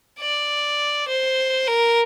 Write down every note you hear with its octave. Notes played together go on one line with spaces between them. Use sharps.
D5
C5
A#4